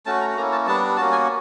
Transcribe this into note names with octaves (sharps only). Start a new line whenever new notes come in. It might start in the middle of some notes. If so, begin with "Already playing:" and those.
A3 C#4 F#4 A5
A#5
A#3 C#4 E4 A#5
A5
G3 B3 D4 A5
A#3 C#4 F#4 A5
G#5